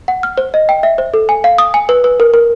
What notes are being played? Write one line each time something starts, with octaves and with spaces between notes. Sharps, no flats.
F#5
F6
C5
D#5
G5
E5
C5
A4
G#5
F5
D#6
G#5
B4
B4
A#4
A#4